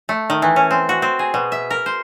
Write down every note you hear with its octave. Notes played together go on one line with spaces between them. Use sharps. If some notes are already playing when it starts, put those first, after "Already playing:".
A3
D#3
E3
C#4
C4
F#4
C4
G#4
B2
E5
A#4
C5